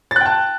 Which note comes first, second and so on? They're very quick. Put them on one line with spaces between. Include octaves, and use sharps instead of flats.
A6 F#6 G5 A5